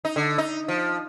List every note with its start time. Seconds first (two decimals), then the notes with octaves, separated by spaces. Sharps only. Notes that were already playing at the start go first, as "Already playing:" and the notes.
0.05 D#4
0.16 D3
0.38 D#4
0.68 F3